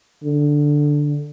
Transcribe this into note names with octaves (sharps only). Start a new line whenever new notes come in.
D3